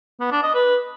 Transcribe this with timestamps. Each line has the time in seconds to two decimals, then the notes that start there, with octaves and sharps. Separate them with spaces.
0.20 B3
0.32 D4
0.43 D#5
0.54 B4